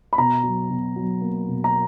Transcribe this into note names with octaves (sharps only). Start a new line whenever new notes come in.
B5
B2 A#5
F#3
B2
F#3
A#3
B2
A#5